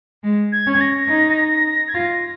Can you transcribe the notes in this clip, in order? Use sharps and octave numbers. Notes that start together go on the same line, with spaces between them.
G#3
G#6
C#4
G#6
A#6
D#4
G#6
F4 A#6